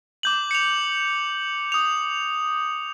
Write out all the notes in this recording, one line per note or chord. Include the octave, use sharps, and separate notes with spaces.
D6 G6 F#7
C#7 F7
D#6 F7